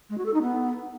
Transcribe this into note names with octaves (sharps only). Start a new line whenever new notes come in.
G#3
F#4
A4
D#4
B3